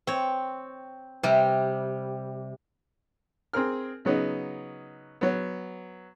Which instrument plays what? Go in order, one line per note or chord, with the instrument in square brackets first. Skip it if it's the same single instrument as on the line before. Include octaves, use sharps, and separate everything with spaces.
[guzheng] C4 C#5
C3 G3
[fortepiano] C4 G#4 A#4 F6
C#3 F#3 B3 D#4
F#3 B3